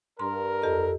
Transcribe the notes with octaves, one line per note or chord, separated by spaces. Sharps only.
G2 A#4 A#5 C6
F2 G4 A4 D#5